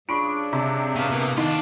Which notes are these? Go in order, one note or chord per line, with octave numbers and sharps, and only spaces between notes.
G2 C#3 D4 F4 C6 C#6 D7
C3
B2 B4 F5
B2 D3 E3 A#3
D#3 D4 F4 D#5